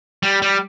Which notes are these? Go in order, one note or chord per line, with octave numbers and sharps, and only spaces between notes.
G3
G3